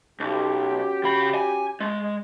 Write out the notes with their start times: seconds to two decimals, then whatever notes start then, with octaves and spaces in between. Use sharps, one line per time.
0.20 B1 C#4 F#4 G4
1.04 C#3 B5
1.35 G#5
1.80 G#3